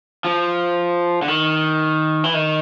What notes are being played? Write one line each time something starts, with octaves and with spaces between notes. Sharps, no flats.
F3
D3
D#3
E3
D#3